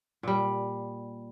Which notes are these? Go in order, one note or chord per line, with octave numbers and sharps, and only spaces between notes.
A#2 G3